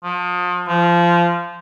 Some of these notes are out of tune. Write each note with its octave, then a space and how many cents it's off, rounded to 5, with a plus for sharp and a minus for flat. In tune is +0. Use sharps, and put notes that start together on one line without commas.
F3 +35
F3 -20